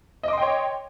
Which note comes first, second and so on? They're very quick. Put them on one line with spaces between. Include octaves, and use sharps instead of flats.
D#5 D6 C6 G5 C#5